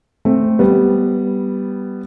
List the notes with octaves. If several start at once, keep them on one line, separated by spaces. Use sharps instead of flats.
A3 C4
G3 B3